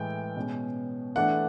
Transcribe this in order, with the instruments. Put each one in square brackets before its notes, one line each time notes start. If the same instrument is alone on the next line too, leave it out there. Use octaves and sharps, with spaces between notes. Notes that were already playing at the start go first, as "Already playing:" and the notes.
Already playing: [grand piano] A2 E3 G#3 G5
B2 G#3 C#4
E3 A3 D4 F#5